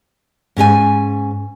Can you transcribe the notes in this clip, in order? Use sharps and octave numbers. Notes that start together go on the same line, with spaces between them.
G#2 C#4 A#4 G#5